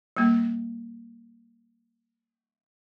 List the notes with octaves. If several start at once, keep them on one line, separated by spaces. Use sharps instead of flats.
G3 A#3